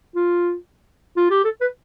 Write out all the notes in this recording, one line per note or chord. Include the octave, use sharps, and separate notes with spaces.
F4
F4
G4
A4
B4